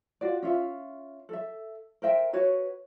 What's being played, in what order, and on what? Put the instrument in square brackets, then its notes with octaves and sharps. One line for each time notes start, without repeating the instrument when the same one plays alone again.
[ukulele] F4 F#4 D5
C#4 F4 E5
A4 E5
A#4 C5 E5 G5
F#4 B4 C#5